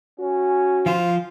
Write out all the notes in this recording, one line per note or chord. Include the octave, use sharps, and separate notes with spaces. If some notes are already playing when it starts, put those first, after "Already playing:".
C#4 F#4
F3 F4 C5 C6